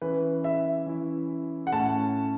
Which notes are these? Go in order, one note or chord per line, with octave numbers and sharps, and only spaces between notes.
E3 C#4 E4 B4
E5
E3 C#4 E4
F#5
A2 A3 C#4 A5